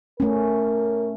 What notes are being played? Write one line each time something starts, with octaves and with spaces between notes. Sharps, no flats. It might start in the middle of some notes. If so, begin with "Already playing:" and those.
A3 C#4 A#4